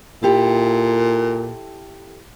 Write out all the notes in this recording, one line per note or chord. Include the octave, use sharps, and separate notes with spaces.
A#2 E4 G4 A4